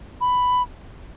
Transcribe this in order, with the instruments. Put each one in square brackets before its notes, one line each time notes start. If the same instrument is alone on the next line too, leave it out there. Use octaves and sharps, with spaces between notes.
[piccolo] B5